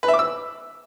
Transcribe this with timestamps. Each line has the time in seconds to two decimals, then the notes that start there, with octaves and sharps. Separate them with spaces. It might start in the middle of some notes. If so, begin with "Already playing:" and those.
0.03 B4
0.08 E5
0.14 D6
0.19 E6